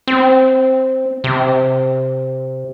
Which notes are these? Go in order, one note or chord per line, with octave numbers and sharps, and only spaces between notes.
C4
C3